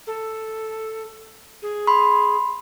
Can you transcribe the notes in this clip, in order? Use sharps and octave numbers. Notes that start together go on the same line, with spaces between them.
A4
G#4
B5 C6